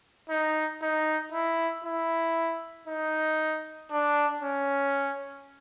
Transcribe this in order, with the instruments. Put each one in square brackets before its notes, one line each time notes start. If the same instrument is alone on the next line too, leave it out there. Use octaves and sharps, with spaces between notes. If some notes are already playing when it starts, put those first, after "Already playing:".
[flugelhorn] D#4
D#4
E4
E4
D#4
D4
C#4